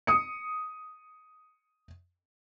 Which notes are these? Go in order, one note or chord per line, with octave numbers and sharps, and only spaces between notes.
D#6 C#7